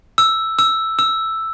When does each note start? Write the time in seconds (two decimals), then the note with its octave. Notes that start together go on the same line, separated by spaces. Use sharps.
0.18 E6
0.59 E6
0.99 E6